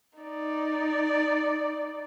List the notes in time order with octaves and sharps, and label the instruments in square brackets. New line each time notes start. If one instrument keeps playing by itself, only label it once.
[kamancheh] D#4 D5